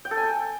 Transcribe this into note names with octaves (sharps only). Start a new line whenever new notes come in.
G5
A4
G#5
G5